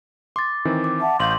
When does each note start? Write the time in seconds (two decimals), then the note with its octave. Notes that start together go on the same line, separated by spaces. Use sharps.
0.36 C6 D6 A6
0.65 D#3 E3 C4
0.84 D6
1.00 E5 F#5 A5
1.20 A1 F5 C6 C#6 G6 F#7